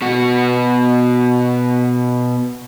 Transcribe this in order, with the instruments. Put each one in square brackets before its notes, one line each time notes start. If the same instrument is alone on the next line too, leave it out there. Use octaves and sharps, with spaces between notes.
[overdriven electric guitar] B2 F#4